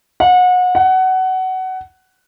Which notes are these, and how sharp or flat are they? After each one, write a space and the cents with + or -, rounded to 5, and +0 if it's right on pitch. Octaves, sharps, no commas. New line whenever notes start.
F#5 -30
F#5 +20